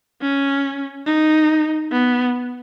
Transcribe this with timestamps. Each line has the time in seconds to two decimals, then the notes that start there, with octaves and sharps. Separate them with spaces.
0.22 C#4
1.07 D#4
1.92 B3